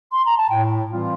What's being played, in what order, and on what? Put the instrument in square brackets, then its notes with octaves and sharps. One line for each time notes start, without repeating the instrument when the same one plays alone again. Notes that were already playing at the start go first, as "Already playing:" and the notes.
[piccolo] C6
A#5
A5
[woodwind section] A2 [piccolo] G5
[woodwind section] E3 G3 C4 F4